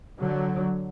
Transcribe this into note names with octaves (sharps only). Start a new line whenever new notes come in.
D3 F#3